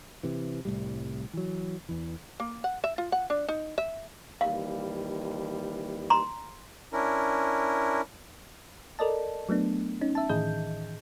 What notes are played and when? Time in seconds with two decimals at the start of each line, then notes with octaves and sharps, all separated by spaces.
0.23 C3 E3
0.65 C2 A2 G3
1.33 E3 F#3
1.89 E2 E3
2.40 A#3
2.64 F#5
2.84 E5
2.98 F4
3.12 F#5
3.30 D4
3.49 D#4
3.78 E5
4.41 D#2 E3 G3 F5
6.10 A#5 C6
6.93 C#4 D4 E4 A#4
8.99 A4 A#4 D5 D#5 A5
9.49 F#3 A3 B3 D4
10.01 C#4 D#4
10.15 E5 A5
10.29 A2 D#3 E3 G#4 D#5 G6